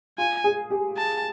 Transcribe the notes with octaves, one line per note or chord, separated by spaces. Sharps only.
F4 G#5
G#4
G4
A5